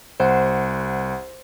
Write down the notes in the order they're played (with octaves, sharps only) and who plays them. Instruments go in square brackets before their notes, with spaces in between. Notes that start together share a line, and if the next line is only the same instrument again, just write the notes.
[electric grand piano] C2 F#5 [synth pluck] C5